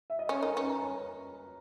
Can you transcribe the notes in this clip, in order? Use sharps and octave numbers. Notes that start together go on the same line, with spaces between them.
E5
D#5
C#4 C#5
D#4 A#4
C#4 B4
A#5